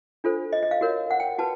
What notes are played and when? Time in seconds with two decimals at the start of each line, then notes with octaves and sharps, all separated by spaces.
0.24 D4 F4 A4 C5
0.53 D#5
0.63 D#5
0.71 F5
0.81 F#4 A#4 C#5
1.11 F#5
1.20 G5
1.39 F#4 B4 A5